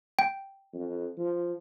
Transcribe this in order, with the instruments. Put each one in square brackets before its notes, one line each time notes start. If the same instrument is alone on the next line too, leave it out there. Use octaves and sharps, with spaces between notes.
[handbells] G5
[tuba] F2
F3